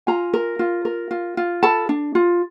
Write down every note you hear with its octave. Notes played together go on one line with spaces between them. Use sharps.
F4 G#5 A#5
A#4
F4
A#4
F4
F4
A4 A5 B5
D4
F4